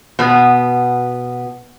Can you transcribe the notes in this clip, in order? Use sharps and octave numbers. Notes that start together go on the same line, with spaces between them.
B2 B3